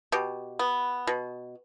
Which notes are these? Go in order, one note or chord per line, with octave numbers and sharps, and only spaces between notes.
B2 G4
B3
B2